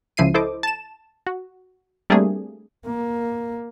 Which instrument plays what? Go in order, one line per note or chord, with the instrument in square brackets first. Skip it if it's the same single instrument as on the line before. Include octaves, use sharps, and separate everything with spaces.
[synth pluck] C#2 C#3 F3 E4 C7 D#7
E4 A4 C5 D#5 D6
A5 E7
F#4
G3 A3 A#3 C4 D4 G#4
[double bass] A#3